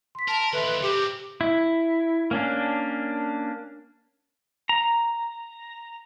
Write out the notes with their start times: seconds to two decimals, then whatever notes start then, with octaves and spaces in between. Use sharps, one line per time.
0.15 C6 B6
0.28 A#4 A5
0.53 D#2 E3 A4 B4 E5 C6
0.82 C#3 C4 G4
1.41 E4
2.31 A#3 C#4 D4
4.69 A#5